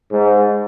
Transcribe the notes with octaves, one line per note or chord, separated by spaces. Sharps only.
G#2